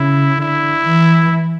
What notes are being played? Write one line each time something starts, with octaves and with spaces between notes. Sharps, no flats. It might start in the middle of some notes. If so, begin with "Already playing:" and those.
Already playing: C#3 E4
D3 E4
E3